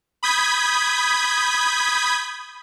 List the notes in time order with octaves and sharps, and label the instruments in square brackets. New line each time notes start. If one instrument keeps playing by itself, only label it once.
[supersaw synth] B5 D#6 G6 G#6 B6